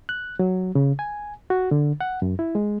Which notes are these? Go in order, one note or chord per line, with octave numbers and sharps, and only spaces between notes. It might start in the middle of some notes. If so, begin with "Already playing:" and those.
F#6
F#3
C#3
G#5
F#4
D3
F#5
F#2
E4
G#3